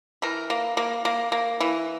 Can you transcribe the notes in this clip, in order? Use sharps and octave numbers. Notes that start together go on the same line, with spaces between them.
E3 A#4
A#3
A#3
A#3
A#3
E3